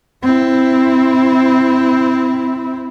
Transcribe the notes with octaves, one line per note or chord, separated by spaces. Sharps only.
C4 E4